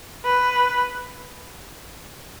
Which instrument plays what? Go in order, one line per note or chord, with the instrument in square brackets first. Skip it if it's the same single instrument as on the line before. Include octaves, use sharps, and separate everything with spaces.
[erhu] B4